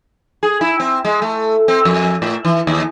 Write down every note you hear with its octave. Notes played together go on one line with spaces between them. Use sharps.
G#4
E4
C4
G#3
A3
C4
F2
A2
E3
D#2